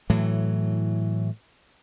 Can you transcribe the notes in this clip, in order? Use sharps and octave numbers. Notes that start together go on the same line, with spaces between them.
A2 E3 F#3